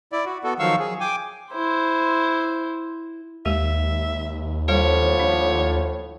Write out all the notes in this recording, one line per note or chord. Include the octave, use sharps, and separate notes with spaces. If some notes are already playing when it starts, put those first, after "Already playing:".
E4 D5
F#4
B3 F#4 A4
D#3 F3 F#3 F5 C#6 E6
G#4
G5 G#5 D6
E4 C5
D#2 G#3 G4 E5
A2 D3 F3 G3 C#5
D#2 D4